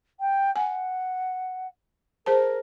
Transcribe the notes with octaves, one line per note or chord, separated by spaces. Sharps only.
G5
F#5 G#5
G#4 A#4 C5 A5